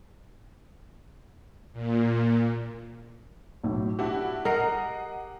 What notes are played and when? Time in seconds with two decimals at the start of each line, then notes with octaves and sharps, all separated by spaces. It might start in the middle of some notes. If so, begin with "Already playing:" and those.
1.73 A#2
3.64 B1 A2
3.99 D4 E4 F#4 G4
4.45 A#4 D#5 F#5 C7